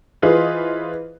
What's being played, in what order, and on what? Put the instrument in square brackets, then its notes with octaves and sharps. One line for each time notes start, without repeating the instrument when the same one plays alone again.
[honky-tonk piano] E3 F4 G#4 B4 C5 D#5